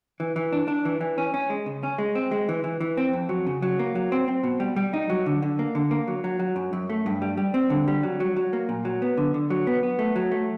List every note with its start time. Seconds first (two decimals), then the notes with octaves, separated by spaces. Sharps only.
0.20 E3
0.36 E3
0.53 D4
0.68 D4
0.85 E3
1.01 E3
1.18 C#4
1.34 C#4
1.50 G#3
1.66 C#3
1.83 C#4
1.98 G#3
2.15 C4
2.32 G#3
2.49 E3
2.64 E3
2.81 E3
2.97 C4
3.13 F2
3.29 F#3
3.47 C#3
3.62 F#3
3.79 A#3
3.95 F#3
4.12 C4
4.28 C4
4.43 B2
4.60 G3
4.76 G3
4.94 D#4
5.10 F#3
5.26 D3
5.42 D3
5.59 A#3
5.75 D3
5.91 A#3
6.08 F#3
6.24 F#3
6.39 F#3
6.56 F#2
6.73 F#2
6.90 A3
7.06 G2
7.22 G3
7.37 G3
7.54 C4
7.70 D3
7.88 G3
8.03 F#3
8.20 F#3
8.36 F#3
8.53 A#3
8.69 A#2
8.85 F#3
9.02 B3
9.17 D3
9.34 D3
9.50 F#3
9.67 B3
9.83 B3
9.99 A3
10.16 F#3
10.32 A3